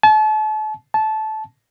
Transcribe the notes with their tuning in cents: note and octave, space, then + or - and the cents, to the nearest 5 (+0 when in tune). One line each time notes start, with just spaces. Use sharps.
A5 -35
A5 -15